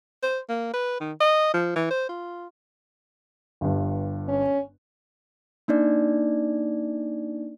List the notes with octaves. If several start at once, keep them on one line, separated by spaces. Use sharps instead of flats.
C5
A#3
B4
D#3
D#5
F3
E3
C5
F4
G1 G2
C#4
A#3 D4 D#4 D5